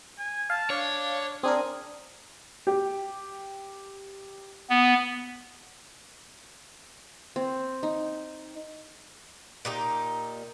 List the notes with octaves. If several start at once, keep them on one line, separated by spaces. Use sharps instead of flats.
G#5
F5 A5
D4 C#5 F5
C4 D4 G#4 A#4
G4
B3
C4
D#4
A#2 D#4 G4